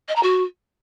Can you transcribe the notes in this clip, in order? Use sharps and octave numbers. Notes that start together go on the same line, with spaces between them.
D#5
A#5
F#4